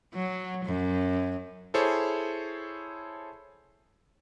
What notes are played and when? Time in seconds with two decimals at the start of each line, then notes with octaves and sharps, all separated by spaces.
0.14 F#3
0.65 F#2
1.74 E4 G#4 A4 C5 C#5